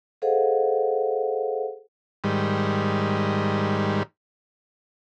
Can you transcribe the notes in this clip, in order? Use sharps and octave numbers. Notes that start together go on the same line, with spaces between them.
G#4 A4 C5 D#5 F5 F#5
G#2 D#3 G3